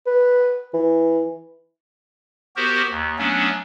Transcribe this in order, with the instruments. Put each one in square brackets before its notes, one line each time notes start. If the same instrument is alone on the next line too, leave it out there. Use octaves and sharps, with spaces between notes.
[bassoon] B4
E3
[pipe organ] B3 F#4 G4 A#4 C5
D#2
F#3 A3 B3 C#4 D4